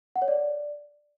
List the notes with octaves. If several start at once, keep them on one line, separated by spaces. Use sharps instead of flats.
F#5
C#5
D5